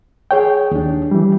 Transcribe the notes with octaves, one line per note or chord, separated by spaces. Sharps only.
G#4 C#5 G5
D#2 D4
E3 G3